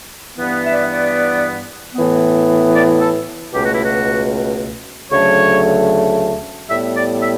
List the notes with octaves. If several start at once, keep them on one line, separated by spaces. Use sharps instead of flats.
G2 E3 B3
E5
D5
E5
D5
A2 E3 B3
D5
A4
C#2 B2 A3 G4
F#4
E4
F#4
D2 C#3 F#3 A3 C#5
A2 G3 B3 E5
D5
E5